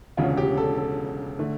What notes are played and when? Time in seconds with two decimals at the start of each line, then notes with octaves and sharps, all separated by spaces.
0.17 E1 D2 C#3 F4
0.37 G4
0.57 A4
0.78 A4
1.39 D3 A3